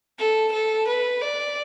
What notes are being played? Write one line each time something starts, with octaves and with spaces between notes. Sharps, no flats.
A4
A4
B4
D5